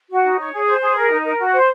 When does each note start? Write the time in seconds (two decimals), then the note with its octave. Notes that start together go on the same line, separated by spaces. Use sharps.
0.09 F#4
0.23 D#4
0.38 C#5
0.53 G#4
0.67 C5
0.82 G#4
0.96 A#4
1.10 D#4
1.25 A#4
1.40 F#4
1.54 C5